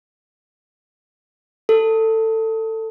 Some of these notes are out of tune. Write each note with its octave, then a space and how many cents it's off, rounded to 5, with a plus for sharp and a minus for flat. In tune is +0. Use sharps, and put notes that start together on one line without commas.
A4 +20